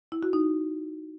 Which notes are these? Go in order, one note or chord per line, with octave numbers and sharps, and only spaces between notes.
E4
F#4
D#4